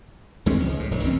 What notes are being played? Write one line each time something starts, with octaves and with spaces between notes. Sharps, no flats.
D#2 G#3 C4 C#4
C#2 F3
A2
F1 A#1 E3 F#3
D#2 C4 C#4